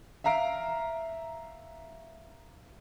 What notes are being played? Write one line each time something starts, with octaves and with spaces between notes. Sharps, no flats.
E5 F5 A#5 C7 D7